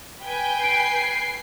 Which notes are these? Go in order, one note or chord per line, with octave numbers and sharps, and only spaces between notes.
B4 G5 G#5
C7 D7